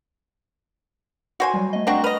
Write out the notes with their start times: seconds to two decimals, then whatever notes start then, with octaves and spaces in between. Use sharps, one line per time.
1.40 F#4 C5 G#5
1.54 F#3 G3
1.73 A3 D#5
1.87 C4 D4 F#4 A5 A#5 C#6
2.04 B4 D#5 F6 D#7 F7